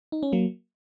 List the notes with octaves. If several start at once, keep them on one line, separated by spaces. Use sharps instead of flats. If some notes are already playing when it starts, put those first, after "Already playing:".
D#4
C#4
F#3 A#3